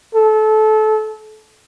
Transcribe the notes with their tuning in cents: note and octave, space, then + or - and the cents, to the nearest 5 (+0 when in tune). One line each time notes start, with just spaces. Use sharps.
A4 -25